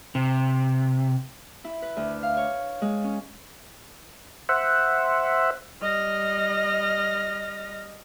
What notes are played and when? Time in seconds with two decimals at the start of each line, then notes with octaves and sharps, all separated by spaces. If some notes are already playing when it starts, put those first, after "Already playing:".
0.15 C3
1.64 E4
1.82 B4
1.97 D2
2.23 F5
2.37 C#5
2.82 G#3
3.04 C#4
4.49 C5 E5 F#5
5.80 G3 D#5 F6 A#6